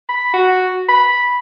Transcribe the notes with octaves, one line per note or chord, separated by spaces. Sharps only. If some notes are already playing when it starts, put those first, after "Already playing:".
B5
F#4
B5